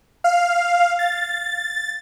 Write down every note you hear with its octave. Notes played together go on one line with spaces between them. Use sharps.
F5
A6